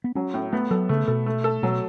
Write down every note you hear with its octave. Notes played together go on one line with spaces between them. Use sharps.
B3
F#3 C#4
A2
A3 B3
F#3 A4
C#3 A3
B2 A4
A3
A4
B2 F#3